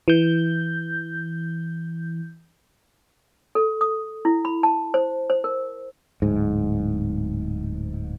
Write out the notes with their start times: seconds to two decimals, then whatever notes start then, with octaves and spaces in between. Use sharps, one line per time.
0.08 E3 G6
3.55 A4
3.81 D#6
4.25 E4
4.45 B5
4.63 A5
4.94 C5
5.30 C5
5.44 A#4
6.22 D1 G#2